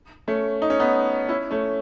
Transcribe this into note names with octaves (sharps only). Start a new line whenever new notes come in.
A3 C#4
D#4
C#4
B3 D#4
C#4 E4
A3 C#4